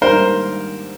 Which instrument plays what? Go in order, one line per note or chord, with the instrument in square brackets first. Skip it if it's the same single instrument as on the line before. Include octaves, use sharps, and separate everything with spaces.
[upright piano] G#2 D#3 G3 A#3 D4 [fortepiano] A#4 C5